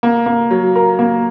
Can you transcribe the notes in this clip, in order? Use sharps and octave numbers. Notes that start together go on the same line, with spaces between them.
A#3
A#3
F#3
A#4
A#3